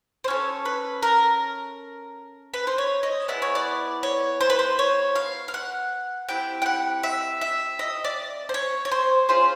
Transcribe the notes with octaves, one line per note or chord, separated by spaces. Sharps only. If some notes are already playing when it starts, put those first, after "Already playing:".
C5
C#4 F#4 C#5
A4
B4
A#4
B4
C5
C#5
D#5
B3 E4 G#4 D5
C#5
D5
C#5
C5
B4
C5
C#5
F5
F5
F#5
C4 E4 G4 G5
G5
F#5
E5
E5
D#5
D5
C5
C#5
C#5
C5
C#4 F4 G#4 C5